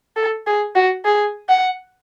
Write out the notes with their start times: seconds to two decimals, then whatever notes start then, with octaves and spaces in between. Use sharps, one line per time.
0.16 A4
0.47 G#4
0.75 F#4
1.05 G#4
1.49 F#5